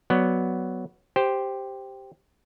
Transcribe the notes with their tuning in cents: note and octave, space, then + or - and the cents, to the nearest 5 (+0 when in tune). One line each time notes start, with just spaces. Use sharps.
F#3 +0 B3 +0 D5 +0
G4 +0 C5 +0